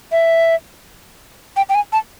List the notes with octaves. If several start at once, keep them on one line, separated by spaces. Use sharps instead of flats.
E5
G5
G5
G#5
A5